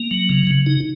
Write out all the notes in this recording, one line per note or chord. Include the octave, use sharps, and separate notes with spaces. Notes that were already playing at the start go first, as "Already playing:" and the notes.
Already playing: A#3
F#3
C#3
C#3
D#4